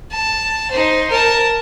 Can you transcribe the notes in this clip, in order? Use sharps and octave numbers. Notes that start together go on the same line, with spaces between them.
A5
D#4 C5
A#4 A5